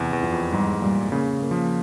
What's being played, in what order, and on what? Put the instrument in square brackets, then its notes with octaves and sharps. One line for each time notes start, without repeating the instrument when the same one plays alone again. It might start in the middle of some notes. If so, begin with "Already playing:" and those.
Already playing: [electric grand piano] E2 [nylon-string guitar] C3
[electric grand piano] E2
[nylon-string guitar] F4
[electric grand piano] F2
[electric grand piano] G#2 [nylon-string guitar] G3
[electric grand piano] A#2 [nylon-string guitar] G3
[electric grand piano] C#3 [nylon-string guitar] A#3
[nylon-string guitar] A#3
[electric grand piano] F3